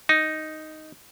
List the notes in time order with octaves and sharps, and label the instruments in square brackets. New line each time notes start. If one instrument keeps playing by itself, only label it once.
[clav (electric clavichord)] D#4